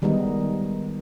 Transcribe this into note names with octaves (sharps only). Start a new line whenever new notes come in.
D#3 G3 G#3 B3 D#4